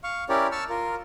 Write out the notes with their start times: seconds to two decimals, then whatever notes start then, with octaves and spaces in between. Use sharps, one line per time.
0.04 F5 C#6
0.29 C#4 E4 G4 A#4 C#5 D5
0.52 A5 C#6 E6 F6
0.69 F4 A#4